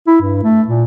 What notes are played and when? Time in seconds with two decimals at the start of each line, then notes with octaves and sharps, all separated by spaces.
0.07 E4
0.22 G2
0.44 A3
0.68 A#2